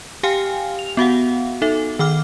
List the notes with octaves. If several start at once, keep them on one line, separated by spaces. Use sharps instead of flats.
G4 F5 G5 G#5 F6
F7
B3 F#4 F5 F#5
D#4 A4 E5
D#3 G5 D6 F6